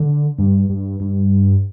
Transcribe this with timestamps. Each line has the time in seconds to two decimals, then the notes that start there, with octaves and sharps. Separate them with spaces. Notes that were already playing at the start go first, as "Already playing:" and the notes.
Already playing: D3
0.38 G2
0.69 G2
1.00 G2